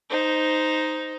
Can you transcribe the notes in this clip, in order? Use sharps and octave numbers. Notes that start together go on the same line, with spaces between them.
D#4 C5